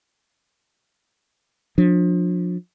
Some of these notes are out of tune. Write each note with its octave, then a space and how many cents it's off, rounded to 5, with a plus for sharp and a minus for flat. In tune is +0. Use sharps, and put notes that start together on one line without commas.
F3 +30 D4 +0